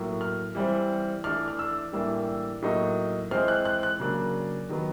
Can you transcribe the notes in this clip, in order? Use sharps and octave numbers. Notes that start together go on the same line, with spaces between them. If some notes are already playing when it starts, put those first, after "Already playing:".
Already playing: A2 F#3 A#3
F6
E3 G3 C4
E3 A3 D4 F6
F6
E6
A2 E3 G3 A#3 D4
A2 F#3 A#3 D#4
E3 G#3 C4 F6
F#6
F#6
F#6
C#3 F#3 A#3 D4
D#3 F#3 B3